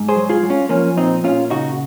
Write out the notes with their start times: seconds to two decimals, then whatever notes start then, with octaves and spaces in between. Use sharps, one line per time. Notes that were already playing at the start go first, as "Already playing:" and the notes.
Already playing: G#2
0.09 G#4 C5
0.16 F#3
0.29 F4 G#4
0.43 F#3
0.50 C#4 F4
0.69 F3 A#3 C#4
0.97 A#2 C4 D#4
1.24 A#2 C#4 F4
1.50 C#3 D#4 F#4